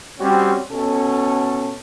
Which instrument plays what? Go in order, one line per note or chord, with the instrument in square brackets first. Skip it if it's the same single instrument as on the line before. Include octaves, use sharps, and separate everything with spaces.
[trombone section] G3 C4 C#4 F#4
B2 C#4 A4